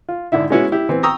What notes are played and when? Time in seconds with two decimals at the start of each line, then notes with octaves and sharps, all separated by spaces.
0.09 F4
0.32 G#1 D3 E4 E5
0.50 G#3 B3 C#4 E4 F#4
0.72 E4 G4
0.89 E3 B3 C4
1.03 G5 A#5 C#6 D#6 E6